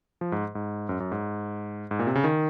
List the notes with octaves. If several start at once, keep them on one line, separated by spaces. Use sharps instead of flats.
F3
G#2
G#2
F#2
F#2
G#2
G#2
A#2
C3
C#3
D#3